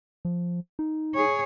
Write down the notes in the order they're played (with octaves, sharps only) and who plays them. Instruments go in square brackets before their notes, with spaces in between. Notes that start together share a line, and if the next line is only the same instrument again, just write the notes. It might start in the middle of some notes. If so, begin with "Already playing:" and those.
[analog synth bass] F3
D#4
[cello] G#4 C#5